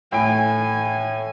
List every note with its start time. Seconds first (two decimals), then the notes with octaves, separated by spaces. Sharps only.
0.12 A2 G#5 D7